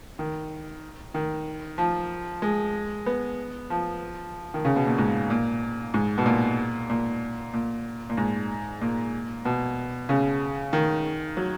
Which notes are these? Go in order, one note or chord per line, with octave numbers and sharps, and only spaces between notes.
D#3
D#3
F3
G#3
B3
F3
D#3
C#3
B2
A#2
G#2
A#2
G#2
B2
A#2
A#2
A#2
A#2
G#2
A#2
B2
C#3
D#3
F#3